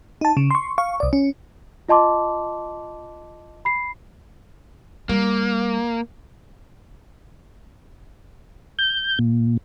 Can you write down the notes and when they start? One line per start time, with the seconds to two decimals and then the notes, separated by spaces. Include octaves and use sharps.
0.21 D#4 A5
0.37 C#3
0.51 C6 C#6
0.78 F5 C#6
1.00 C2 D5
1.13 C#4
1.89 F4 D#5 A5 C6 D6
3.65 B5 C7
5.09 G3 A#3
8.79 G6
9.19 A#2